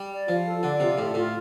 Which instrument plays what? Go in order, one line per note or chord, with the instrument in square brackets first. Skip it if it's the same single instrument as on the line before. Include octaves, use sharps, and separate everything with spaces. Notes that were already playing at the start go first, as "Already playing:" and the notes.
Already playing: [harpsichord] G3
[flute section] D5
[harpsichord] F3 [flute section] F4
[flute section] A4
[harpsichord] D3 [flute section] D5
[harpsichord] C3 [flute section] F4
[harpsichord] A2 [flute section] A4
[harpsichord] A2 [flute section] F4